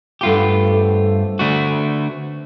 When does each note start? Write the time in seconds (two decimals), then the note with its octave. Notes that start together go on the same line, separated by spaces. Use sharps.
0.21 G2 A3 B3 F4 G4 E5
0.63 C3 A4
1.39 D3 A3 F#4